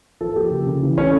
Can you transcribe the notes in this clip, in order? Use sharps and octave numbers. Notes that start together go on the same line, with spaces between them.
F3 A4
A#3 G4
C#3
C#3
E3
A3 C#4